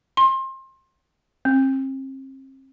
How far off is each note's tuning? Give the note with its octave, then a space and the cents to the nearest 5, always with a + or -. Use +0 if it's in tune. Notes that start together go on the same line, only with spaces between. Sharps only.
C6 +25
C4 +35